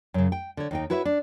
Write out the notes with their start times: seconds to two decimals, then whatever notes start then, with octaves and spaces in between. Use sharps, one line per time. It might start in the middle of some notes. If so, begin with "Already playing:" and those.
0.14 F#2 C#3
0.32 G5
0.57 D3 C#5
0.71 D#2 D#4 G5
0.90 E4 F#4 B4 C#5 D#5 E5
1.05 D4